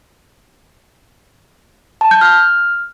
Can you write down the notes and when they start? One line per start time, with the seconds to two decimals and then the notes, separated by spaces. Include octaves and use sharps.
2.01 A5
2.11 G6
2.21 F6